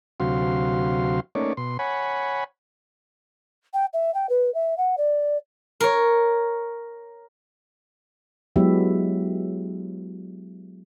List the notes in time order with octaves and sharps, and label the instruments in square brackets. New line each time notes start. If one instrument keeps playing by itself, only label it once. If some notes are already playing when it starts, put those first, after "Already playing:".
[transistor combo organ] D2 C3 F#3 F#4 F5 C6
A3 A#3 C#4 D#4 C#5 D5
B2 C6
C#5 F#5 G#5 B5
[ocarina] G5
E5
G5
B4
E5
F#5
D5
[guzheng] A#4 C#5
[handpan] F#3 G#3 B3 E4 G4 E5